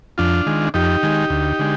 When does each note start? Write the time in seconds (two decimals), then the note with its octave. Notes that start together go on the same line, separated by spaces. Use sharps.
0.18 F2 D4 F4
0.46 D#3 G#3
0.74 F2 D#4 G4
1.03 D#3 G#3
1.30 D2
1.59 D3 G#3